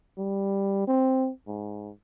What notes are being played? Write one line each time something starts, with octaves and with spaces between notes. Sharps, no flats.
G3
C4
G#2